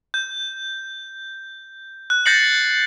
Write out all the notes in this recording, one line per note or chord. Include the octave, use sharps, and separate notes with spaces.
G6
F#6
G6 A6 A#6 C7 C#7 F#7